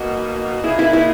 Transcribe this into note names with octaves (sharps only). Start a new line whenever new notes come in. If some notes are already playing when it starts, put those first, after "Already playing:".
Already playing: B2 A#3 D#4 F#4
A#2 A#3 D#4 E4 G#4
E4
E4